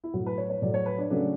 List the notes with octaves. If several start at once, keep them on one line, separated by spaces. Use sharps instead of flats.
E4
A2 F#3 A3 F#4
B4
C#5
C#5
A2 F#3 A3 D5
C#5
B4
D4
C#3 F#3 A3 D4